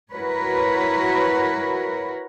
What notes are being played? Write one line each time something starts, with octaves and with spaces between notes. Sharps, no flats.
E4 F#4 A#4 B4 C#5